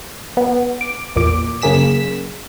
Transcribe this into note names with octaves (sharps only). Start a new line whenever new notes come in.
B3
D6
A1 E2 A#2 D6
F#2 C#3 A#3 G#4 B6 E7